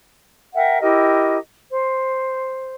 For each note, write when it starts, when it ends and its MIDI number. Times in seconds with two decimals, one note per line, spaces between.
0.53 0.79 70
0.53 0.79 76
0.53 0.79 78
0.53 0.79 79
0.81 1.37 64
0.81 1.37 67
0.81 1.37 70
0.81 1.37 75
1.70 2.75 72